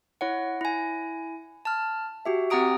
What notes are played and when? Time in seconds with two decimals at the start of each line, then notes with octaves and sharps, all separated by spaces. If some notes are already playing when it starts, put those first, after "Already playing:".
0.21 E4 C#5 F#5
0.61 E4 G#5
1.65 A5 F6
2.25 F#4 G4 E5
2.50 C4 G4 F#5 A#5 D#6 D7